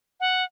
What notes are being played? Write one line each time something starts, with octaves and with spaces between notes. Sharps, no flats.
F#5